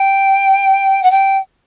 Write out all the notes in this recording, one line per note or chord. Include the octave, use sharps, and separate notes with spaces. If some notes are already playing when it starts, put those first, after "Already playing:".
Already playing: G5
F#5
G5